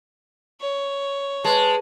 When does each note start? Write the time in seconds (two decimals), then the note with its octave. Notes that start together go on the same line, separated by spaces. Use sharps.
0.61 C#5
1.44 G#3 B4 A5